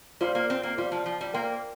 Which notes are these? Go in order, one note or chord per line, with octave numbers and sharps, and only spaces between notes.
G3 F4 C5 F5 C6
A#3
C4
A#3
G3 F4 C5 F5 C6
F3
F3
G3
A#3 A#4 G5 C6